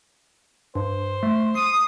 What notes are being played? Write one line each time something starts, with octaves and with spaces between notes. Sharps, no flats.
G2 C5
A3
D#6 C7